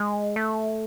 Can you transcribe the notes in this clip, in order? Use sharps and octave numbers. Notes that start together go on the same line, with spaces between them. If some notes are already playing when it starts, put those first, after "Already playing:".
Already playing: G#3
A3